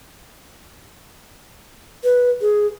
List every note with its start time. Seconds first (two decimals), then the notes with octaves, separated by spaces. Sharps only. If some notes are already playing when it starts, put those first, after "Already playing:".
2.04 B4
2.41 G#4